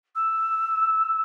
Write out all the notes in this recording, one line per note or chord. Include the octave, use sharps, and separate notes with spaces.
E6